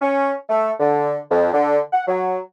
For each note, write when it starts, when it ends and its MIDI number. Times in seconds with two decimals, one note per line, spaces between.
0.01 0.34 61
0.49 0.71 57
0.80 1.19 50
1.31 1.50 41
1.53 1.79 50
1.93 2.02 78
2.08 2.38 54